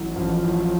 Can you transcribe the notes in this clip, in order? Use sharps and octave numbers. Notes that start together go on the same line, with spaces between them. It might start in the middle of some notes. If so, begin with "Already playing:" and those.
Already playing: A1 A2 F#3
A1 F3
A2 F#3